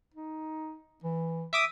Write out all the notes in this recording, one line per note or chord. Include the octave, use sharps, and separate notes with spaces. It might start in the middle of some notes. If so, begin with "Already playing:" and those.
D#4
E3
E5 D6 D#6